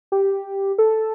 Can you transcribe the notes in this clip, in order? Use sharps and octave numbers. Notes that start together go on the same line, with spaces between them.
G4
A4